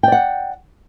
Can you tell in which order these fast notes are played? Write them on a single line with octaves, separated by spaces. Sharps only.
G5 D5 F#5